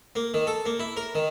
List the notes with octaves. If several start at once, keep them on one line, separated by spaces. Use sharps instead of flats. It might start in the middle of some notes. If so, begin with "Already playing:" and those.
A#3
D#3
A4
A#3
E4
A#4
D#3